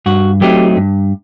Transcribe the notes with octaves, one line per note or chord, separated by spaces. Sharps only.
G2 F#4
F#3 A3 C4 D#4 G4
G2